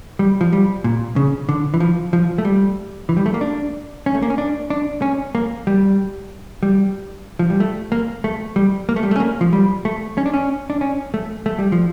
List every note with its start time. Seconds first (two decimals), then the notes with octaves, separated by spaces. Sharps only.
0.19 G3
0.41 F3
0.52 G3
0.84 A#2
1.16 C#3
1.49 D3
1.74 E3
1.80 F3
2.13 F3
2.38 A3
2.45 G3
3.09 E3
3.17 G3
3.26 A3
3.34 A#3
3.41 D4
4.06 C#4
4.14 A3
4.23 A#3
4.30 C#4
4.38 D4
4.70 D4
5.02 C#4
5.35 A#3
5.67 G3
6.63 G3
7.39 F3
7.50 G3
7.60 A3
7.92 A#3
8.24 A3
8.56 G3
8.89 A#3
8.96 A3
9.03 G3
9.11 A3
9.16 C#4
9.20 A#3
9.41 F3
9.53 G3
9.85 A3
10.18 C#4
10.26 D4
10.34 C#4
10.70 D4
10.81 C#4
11.14 A3
11.46 A3
11.59 G3
11.72 F3